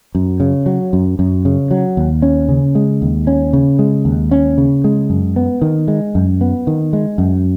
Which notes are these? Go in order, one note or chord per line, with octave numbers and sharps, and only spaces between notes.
F#2
C#3
F#3
F#2
F#2
C#3
F#3
D#2
C#4
C#3
G#3
D#2
C#4
C#3
G#3
D#2
C#4
C#3
G#3
F#2
B3
D#3
G#3
F#2
B3
D#3
G#3
F#2